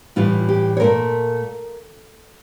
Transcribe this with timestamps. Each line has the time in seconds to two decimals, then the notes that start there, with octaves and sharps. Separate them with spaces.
0.16 A2 E3 G3 F4
0.49 G4
0.77 C#5
0.80 A#2 A3 A#4